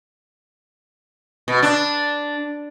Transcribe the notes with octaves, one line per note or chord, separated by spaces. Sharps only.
B2
D4